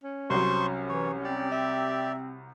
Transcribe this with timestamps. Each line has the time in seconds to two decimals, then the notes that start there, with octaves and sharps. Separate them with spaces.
0.03 C#4
0.30 C2 F#3 C5 C6 C#6
0.89 E3 C#5
1.24 C4 G4 D5
1.51 E5